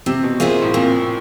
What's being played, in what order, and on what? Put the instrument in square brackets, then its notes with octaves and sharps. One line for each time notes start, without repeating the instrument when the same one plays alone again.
[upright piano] C3 [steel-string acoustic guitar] C4
[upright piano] B2
[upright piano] A#2 [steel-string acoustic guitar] F4 G#4 C5 E5
[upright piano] A2
[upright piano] A#2 [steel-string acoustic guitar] C4